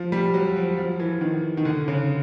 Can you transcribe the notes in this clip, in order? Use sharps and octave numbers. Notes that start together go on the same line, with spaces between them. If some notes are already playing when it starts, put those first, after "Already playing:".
Already playing: F3
G3
F#3
F3
F3
E3
D#3
D#3
D3
C#3